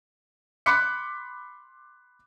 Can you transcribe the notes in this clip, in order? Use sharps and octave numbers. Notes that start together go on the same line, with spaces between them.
B5 C6 D6 F#6 B6 C#7